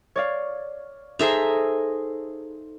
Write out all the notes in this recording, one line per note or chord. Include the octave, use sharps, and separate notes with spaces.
C#5 D5 F5
D#4 G#4 A4 C5 E5 A#5